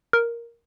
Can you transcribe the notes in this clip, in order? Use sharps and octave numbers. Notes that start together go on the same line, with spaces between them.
A#4